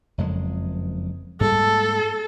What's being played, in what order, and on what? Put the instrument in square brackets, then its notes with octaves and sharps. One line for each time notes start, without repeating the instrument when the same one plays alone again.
[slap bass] F#1 F2 G#3
[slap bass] G#2 G3 A#3 [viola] A4